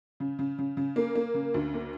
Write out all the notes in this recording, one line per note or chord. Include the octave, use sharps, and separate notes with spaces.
C#3
C#3
C#3
C#3
A#3
A#3
C#3
D2
A#3